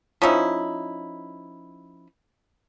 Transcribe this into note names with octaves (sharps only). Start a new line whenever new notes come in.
F3 C#4 D#4 E4